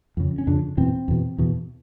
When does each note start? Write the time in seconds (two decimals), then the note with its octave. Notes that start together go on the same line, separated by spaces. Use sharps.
0.17 F2 C#3
0.38 C#4
0.47 F2 C#3 D4
0.77 E2 B2 C4
1.08 E2 B2
1.38 E2 B2